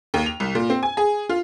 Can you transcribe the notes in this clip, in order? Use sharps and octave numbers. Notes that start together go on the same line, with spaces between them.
D#2
F7
C2
A#2
C4
G#5
G#4
F4